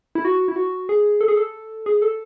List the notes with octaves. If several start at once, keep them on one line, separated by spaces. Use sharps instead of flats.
E4
F#4
E4
F#4
G#4
A4
G#4
A4
G#4
A4